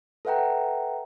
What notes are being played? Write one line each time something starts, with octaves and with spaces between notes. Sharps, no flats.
A4 B4 E5 F#5 G5 A#5